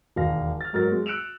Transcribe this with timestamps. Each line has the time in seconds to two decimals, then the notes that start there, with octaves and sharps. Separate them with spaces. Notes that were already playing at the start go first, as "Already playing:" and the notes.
0.16 E1 D#2 F5 A#6
0.61 F6 A6
0.73 G#2 F#3 A#4 A6
0.92 G#3
1.06 E6 F#6 C#7 D7 E7 F7